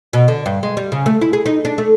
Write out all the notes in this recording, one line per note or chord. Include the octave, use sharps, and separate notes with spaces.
B2
D3
G2
G#3
G3
C#3
A3
E4
G#4
D#4
D4
A3